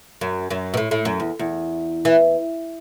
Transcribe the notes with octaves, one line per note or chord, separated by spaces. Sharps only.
F#2
F#2
B2
A2
A2
F#2
E2
E2
E3